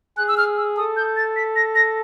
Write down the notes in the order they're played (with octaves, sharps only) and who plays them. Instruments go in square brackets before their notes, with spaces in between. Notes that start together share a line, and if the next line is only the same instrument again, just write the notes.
[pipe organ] G#4 [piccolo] F#6
[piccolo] E6
F6
E6
[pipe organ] A4 [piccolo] D#6
[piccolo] G6
A6
B6
A#6
A#6